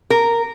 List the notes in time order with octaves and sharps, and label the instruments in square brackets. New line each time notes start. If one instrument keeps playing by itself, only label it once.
[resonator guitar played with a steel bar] A#4